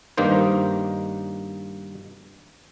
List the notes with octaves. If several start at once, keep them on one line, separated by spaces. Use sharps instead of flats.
G2 D#3 A#3 D#4 C5